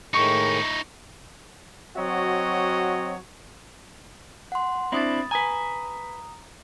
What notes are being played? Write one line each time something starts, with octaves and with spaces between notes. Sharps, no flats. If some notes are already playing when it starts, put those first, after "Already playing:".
A2 D#3 G#3 D#4 E4 C#6
F#3 C4 F#4 C#5 D#5
F#5 C6
C4 D4 E4 B5 D#6 A6
B4 G#5 A#5 D#6